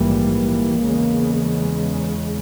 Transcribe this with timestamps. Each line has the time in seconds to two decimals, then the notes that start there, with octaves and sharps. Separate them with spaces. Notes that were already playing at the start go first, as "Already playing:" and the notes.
Already playing: A#1 G#2 E3 G3 A#3
0.85 E2 C#3 G#3